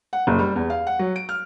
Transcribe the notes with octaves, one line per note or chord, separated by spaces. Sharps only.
F#5
F#1
G3
E2
F5
F#5
F#3
D7
F6